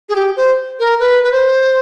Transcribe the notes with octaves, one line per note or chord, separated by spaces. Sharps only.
G#4
G4
C5
A#4
B4
B4
C5